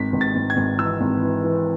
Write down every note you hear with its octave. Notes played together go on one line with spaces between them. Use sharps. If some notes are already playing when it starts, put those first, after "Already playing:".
Already playing: G#1 B6
G#1
A6
G#1
G#6
G#1
E3 E6
G#1
E3
E3